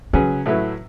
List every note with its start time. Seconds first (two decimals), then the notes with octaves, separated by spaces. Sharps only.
0.13 C#3 F#3 C#4 G#4 B4
0.46 A2 F#3 A3 E4 B4